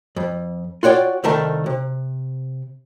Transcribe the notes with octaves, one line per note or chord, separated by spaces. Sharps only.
F2
F4 F#4 C#5 D5 G5
C2 D#3 A3 D#4 A#4 A5
C3